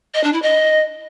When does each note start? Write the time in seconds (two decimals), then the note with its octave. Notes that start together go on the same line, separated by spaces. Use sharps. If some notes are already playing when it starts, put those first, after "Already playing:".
0.14 D#5
0.23 D4
0.33 E4
0.42 D#5